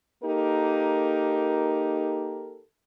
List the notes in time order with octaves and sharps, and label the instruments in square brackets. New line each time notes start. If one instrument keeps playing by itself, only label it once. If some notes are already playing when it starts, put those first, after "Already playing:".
[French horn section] A#3 D#4 G4 A4 A#4